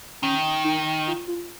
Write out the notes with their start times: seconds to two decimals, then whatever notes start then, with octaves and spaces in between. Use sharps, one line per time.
0.22 D#3 C#4
0.64 D#4
1.07 F4
1.28 F4